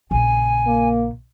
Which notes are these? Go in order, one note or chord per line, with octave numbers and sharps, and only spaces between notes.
A#1 C#3 G#5
A#3